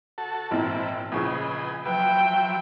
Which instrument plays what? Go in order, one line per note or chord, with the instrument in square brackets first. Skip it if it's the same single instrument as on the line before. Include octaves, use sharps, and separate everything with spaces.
[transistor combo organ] F#4 A4 A5
[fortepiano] G#1 A#2 [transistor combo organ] E3 C4 E4
[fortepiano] A#1 C#3 F3 [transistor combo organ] B4 D#5 G#5
[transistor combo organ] F3 F#3 E5 [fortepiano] B4 [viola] G5